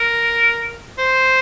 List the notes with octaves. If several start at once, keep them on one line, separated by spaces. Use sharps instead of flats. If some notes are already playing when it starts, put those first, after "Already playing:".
Already playing: A#4
C5